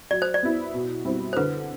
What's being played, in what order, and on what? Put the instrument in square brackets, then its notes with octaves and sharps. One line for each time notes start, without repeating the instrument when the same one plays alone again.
[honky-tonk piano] F#3 [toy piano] D5
[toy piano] C5
D5
[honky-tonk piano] B3 E4
B2
G3 C4 E4
[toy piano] C5
[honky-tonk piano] D3 [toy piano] B4